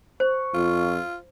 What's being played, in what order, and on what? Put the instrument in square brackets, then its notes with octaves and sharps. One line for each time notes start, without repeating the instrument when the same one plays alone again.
[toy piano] C5 [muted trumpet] C#6
[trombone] F2 [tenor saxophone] F4